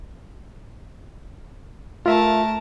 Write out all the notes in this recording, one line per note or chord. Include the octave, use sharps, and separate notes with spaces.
A3 F4 A#4 E5 A5